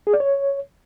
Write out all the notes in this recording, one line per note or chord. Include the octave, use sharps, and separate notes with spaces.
G#4
D5
C#5